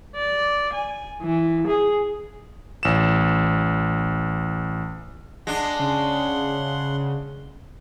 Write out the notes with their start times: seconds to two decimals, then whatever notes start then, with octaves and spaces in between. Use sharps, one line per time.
0.16 D5
0.74 G#5
1.22 E3
1.67 G#4
2.83 A1 E7
5.47 G#3 D4 F#5 C6 A#6
5.80 C#3